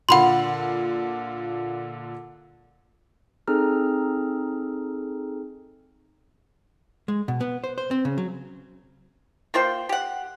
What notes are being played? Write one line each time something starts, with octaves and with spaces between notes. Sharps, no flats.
A#2 D3 F4 F#5 B5 C6
C4 D#4 G#4 A4 A#5 F6
G#3
B2
B3
C5
C5
C4
C#3
F#3
A#3 F4 C5 G5
G4 F#5